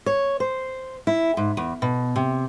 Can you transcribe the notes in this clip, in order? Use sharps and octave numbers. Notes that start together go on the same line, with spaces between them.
C#5
C5
E4
G#2
E2
B2
C3